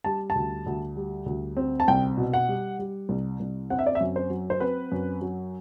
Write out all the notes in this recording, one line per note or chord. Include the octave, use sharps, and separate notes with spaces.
G3 A5
A5
D2
D2
G3
D2
C4
A5
C2 G5
B2
F#5
G3
G3
C2
C2
C4 F#5
E5
D5
E5
F#2
C5
F#3
C5
C4 B4
F#2
F#3